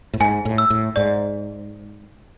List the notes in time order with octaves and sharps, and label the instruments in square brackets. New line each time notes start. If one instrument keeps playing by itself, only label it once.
[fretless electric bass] A2
[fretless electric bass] G#2 [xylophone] G#5
[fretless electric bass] A2
[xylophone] E6
[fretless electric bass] A2
[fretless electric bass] G#2 [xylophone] D5